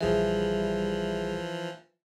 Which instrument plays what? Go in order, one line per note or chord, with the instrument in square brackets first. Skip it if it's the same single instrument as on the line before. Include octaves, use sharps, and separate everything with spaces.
[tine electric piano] A#1 G#4 E5 [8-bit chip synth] E3 F3 [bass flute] G3